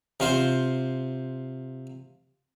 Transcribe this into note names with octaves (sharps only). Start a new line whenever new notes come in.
C3 F4 C5